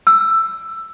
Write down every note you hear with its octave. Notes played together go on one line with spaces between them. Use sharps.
E6